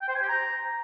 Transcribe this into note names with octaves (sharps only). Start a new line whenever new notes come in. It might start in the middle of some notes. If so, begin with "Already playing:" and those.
G5
C5
G#5
G4
A#5